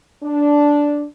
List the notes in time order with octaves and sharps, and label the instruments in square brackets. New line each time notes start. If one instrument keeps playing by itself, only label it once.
[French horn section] D4